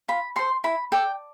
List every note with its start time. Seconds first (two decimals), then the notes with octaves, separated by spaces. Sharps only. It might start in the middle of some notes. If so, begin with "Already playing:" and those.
0.08 F4 B5
0.36 A4 C5 C6
0.64 E4 B5
0.92 A4 D5 G5